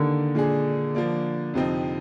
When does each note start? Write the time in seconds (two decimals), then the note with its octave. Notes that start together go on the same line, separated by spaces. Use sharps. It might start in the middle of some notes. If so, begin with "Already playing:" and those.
Already playing: D3 D#3 A#3 D#4 G4 A#4
0.35 A#2 G#3 D4 G#4
0.95 F3 A#3 D4
1.54 F2 C3 F3 C4 D#4